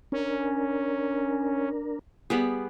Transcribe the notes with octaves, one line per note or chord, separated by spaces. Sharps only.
C#4 D4 A#4
G3 B3 G#4